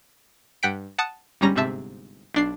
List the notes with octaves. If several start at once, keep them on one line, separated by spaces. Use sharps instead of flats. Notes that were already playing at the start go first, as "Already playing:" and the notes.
G2 F#5 G5 B6 D7
F#5 A5 D#6 F#6 C#7
G1 G#2 G3 C#4 A#5 A#6
G1 G#2 C3 E5 A5
B1 D4 C7